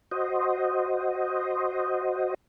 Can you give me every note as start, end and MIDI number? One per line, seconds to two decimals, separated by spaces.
0.11 2.34 66
0.11 2.34 72
0.11 2.34 75